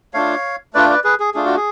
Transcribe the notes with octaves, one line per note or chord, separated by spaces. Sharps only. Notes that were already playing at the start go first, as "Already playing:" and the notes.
A3 D4 F4 C#5 F5
A3 D4 F4 B4 D5
B4 D5
G#4 B4
G#4
A3 D4 F4 G#4
F#4
G#4